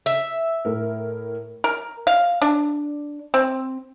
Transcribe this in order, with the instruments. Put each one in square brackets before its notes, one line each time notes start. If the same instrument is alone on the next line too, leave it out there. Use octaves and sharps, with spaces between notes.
[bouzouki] E5
[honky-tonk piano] A2 A#4
[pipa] A#4
F5
D4
C4